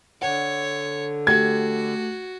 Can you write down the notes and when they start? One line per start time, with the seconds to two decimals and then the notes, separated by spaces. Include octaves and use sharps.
0.22 D3 C#5 F#5
1.27 A3 F#4 G4 G#6